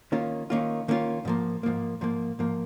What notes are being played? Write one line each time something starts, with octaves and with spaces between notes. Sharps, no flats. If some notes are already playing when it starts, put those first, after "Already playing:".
D#3 A#3 C#4 F4
D#3 A#3 C#4 F4
D#3 A#3 C#4 F4
G#2 F3 A#3
G#2 F3 A#3
G#2 F3 A#3
G#2 F3 A#3